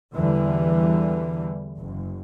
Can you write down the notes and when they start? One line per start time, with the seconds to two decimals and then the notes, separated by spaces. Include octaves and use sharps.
0.14 E2 D3 E3 G3
1.77 F#1